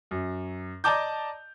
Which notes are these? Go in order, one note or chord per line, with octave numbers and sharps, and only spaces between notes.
F#2
D5 D#5 A5 A#5 D6 G6